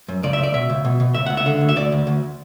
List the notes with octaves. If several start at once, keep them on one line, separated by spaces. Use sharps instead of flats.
F#2
C#2 D5
E5
C#2
D5
B2 E5
C#2
B2
B2
C#2 E5
C#2 F#5
E5
D3
D2
E5
D2 D5
D2
D2